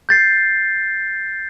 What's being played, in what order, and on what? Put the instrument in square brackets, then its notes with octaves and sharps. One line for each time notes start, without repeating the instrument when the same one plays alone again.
[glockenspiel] G6 A6 C7